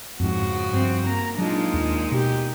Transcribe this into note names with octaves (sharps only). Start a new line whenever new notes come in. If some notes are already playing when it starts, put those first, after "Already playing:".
F2 G#2 C#3 F3 F#4
G2 C4
A#3 A#5
A#2 F#3 G#3 D4 D#4 F4
D#2
B2 G4